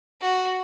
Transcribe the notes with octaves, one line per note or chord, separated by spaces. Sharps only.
F#4